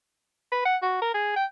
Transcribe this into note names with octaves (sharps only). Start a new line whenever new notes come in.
B4
F#5
F#4
A#4
G#4
G5